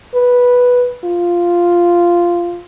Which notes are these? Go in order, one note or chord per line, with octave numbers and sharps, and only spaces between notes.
B4
F4